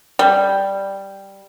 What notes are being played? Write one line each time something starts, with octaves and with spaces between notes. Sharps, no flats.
G3